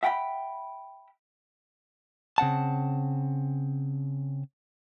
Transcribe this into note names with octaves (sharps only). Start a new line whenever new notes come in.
E5 F#5 G5 A#5 B5
C#3 C4 F#5 A5